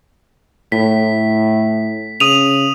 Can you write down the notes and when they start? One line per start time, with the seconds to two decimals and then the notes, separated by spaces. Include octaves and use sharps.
0.72 A2 B6
2.20 C#3 D#6 D#7 F7